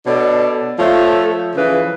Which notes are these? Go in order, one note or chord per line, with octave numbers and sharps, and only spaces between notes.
B2 D4 A4 C#5
F3 A3 A4 C#5
C#3 E3 F3 B4